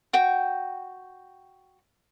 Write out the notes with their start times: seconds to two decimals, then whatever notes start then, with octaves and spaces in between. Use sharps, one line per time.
0.13 F#4 G5